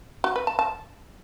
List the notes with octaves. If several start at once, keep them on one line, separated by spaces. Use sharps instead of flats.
F#4
B4
A5
A5